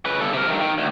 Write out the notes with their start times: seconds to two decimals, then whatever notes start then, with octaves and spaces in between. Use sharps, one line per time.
0.06 C#3 B4
0.21 G2 A4
0.33 C3 A#4
0.48 G2 D#3
0.61 D#3
0.78 D2